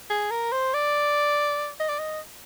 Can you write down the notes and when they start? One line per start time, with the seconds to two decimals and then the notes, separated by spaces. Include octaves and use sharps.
0.10 G#4
0.31 A#4
0.52 C5
0.74 D5
1.80 D#5
1.89 D5
1.99 D#5